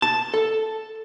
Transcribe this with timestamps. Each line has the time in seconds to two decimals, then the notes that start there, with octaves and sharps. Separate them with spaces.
0.02 A5
0.34 A4